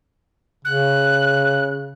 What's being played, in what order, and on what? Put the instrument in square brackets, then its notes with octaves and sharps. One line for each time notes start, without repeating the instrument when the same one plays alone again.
[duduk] C#3 [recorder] F#6